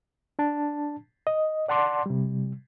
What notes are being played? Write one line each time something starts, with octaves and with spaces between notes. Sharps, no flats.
D4 A5
D#5
D5 F#5 A5 C6 D6
C3 G3